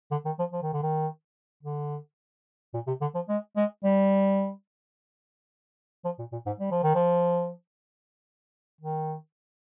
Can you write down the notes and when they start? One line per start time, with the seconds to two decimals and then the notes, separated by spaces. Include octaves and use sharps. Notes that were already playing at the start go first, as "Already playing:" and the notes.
0.11 D3
0.25 D#3
0.39 F3
0.53 F3
0.62 D#3
0.73 D3
0.83 D#3
1.63 D3
2.74 A#2
2.87 C3
3.01 D3
3.15 F3
3.29 G#3
3.56 G#3
3.84 G3
6.05 F3
6.19 A#2
6.32 A#2
6.46 G#2
6.60 G3
6.71 F3
6.83 D#3
6.95 F3
8.81 D#3